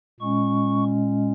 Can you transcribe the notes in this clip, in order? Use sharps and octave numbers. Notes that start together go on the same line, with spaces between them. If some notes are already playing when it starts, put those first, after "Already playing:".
A#2 G#3 C#4 C#6